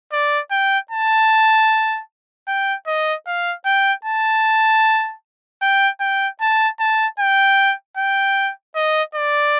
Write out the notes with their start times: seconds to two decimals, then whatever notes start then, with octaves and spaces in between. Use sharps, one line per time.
0.13 D5
0.51 G5
0.91 A5
2.48 G5
2.87 D#5
3.27 F5
3.65 G5
4.05 A5
5.62 G5
6.01 G5
6.41 A5
6.80 A5
7.19 G5
7.97 G5
8.75 D#5
9.15 D5